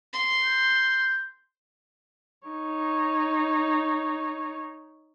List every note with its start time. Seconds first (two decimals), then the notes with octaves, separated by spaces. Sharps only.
0.13 C6
0.44 G6
2.48 D#4 C#5